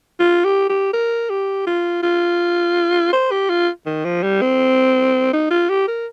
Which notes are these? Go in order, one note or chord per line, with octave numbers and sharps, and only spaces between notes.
F4
G4
G4
A#4
G4
F4
F4
C5
G4
F4
D#3
F3
G3
C4
D#4
F4
G4
A#4